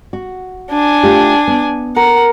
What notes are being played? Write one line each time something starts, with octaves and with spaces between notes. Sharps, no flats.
F#4
D4 G#5
A3 F4 G4
B3
A#4 F#5